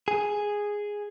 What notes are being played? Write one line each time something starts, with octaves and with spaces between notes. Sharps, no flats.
G#4